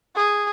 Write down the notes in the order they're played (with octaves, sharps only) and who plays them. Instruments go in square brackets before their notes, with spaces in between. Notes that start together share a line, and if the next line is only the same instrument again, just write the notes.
[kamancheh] G#4